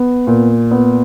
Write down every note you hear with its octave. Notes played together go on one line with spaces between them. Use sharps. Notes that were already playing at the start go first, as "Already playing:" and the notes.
Already playing: B3
A#2
B3